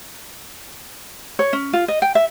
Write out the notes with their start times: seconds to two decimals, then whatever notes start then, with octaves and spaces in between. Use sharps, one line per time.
1.39 C#5
1.53 C#4
1.73 F4
1.88 D#5
2.02 G5
2.15 E5